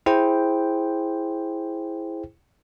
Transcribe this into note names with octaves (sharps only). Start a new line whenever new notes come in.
E4 G#4 C5 G5